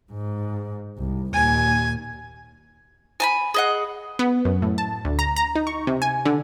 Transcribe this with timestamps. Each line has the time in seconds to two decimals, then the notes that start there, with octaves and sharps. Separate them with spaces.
0.12 G#2
0.98 C2
1.33 D#2 A#2 G#5
3.20 G#5 A5 B5
3.54 G#4 D#5 F#5
4.19 B3
4.45 F#2
4.62 A2
4.78 A5
5.05 D2
5.19 A#5
5.36 A#5
5.55 D#4
5.67 C#6
5.87 C3
6.02 G#5
6.25 D3